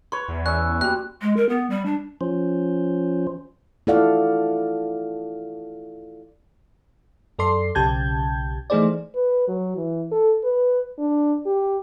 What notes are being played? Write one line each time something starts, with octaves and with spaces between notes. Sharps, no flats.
B4 C#5 C6
E2
C#4 D5 E6 F#6
G3 A#3 F#4 F#6
G#3
A#4
B3
G3
D4
F3 C#4 C5
E4 F4 A4 D5 F5 F#5
F#2 A4 D5 C6 C7
B1 C#3 G4 A5 G6 G#6
E3 A3 D#4 G#4 C5 D5
B4
F#3
E3
A4
B4
D4
G4